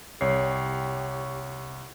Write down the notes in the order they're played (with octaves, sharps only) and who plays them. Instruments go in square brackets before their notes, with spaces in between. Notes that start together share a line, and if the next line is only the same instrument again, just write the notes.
[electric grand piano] C2 C7 [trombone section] G4 [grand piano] C#5